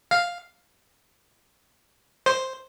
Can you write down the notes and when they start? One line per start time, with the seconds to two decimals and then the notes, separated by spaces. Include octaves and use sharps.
0.11 F5
2.26 C5